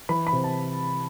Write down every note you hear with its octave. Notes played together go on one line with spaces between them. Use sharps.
E3 B5
B5
C3
A5